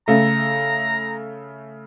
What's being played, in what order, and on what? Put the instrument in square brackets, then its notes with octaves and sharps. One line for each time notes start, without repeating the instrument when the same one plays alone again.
[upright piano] C#3 A3 [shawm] A#5